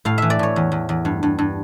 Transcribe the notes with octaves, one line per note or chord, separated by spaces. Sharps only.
A2 F5
E3 E5
D5
A2 C#5
E2
E2
E2
G2
G2
G2